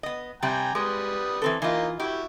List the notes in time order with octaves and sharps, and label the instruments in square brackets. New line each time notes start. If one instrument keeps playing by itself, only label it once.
[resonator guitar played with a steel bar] B3 D#5
[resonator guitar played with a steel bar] C3 G3 [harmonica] G5 G#5 A#5
[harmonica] G3 B4 D#6 [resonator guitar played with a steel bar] G#3
[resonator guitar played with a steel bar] E3 C4 A4
[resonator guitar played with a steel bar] E3 F4 [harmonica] A#3 D#4 D#5
[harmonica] E4 F#4 [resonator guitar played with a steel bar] G4